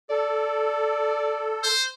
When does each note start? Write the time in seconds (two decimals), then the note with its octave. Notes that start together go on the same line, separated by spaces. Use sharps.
0.10 A4 D5
1.63 C5